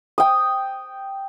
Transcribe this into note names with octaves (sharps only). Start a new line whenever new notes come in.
G5 D#6